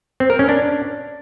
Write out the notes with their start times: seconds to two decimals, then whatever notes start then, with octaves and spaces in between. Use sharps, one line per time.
0.20 C4
0.30 A#4
0.39 C#4
0.49 D4